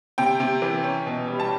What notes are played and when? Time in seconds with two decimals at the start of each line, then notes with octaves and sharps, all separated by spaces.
0.18 C3 G5
0.40 C3
0.62 E3
0.84 C#4
1.06 B2
1.28 G3
1.40 A5